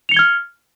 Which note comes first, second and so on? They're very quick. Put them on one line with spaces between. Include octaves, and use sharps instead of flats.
F7 C#7 G7 G#6 F6